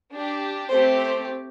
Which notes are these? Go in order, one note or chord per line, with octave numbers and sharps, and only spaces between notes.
D4 G4
A3 C4 G4 C5
C5